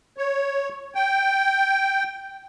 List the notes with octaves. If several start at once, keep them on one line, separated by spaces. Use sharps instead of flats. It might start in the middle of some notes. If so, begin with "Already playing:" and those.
C#5
G5